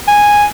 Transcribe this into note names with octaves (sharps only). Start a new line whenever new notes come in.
G#5